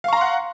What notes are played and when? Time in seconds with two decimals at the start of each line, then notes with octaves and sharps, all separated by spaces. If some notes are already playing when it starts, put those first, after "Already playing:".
0.04 F5
0.08 C#6
0.13 A#5
0.17 C6
0.21 F#5